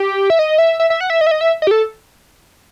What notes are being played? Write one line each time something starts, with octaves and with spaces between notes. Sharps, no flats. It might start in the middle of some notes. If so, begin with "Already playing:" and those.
Already playing: G4
E5
D#5
E5
E5
E5
F#5
E5
D#5
E5
D#5
E5
D#5
G4
A4